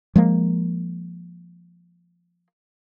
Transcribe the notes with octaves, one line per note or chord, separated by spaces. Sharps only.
F3 G#3 A#3